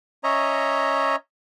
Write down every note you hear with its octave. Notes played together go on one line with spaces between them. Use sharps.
C#4 C#5 D#5 E5 A#5